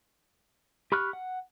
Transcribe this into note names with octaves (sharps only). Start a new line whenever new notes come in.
G4 B5 C#6 F6 F#6
F#5